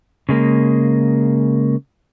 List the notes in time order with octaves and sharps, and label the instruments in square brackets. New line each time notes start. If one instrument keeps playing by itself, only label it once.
[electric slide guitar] C#3 G#3 A#3